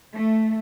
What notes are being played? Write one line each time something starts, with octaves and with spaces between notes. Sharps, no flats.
A3